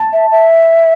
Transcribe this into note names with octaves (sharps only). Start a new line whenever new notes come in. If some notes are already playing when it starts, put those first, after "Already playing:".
Already playing: A5
E5
E5